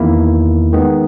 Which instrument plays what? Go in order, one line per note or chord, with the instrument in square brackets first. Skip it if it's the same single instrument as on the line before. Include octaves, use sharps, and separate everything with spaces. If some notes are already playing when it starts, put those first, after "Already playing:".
Already playing: [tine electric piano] E2 D#3 A#3 E4
D#3 G#3 B3